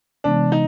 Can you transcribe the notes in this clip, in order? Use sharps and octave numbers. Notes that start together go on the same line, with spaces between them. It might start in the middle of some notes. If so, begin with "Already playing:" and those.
C3 E3 G#3 B3 D4
D#4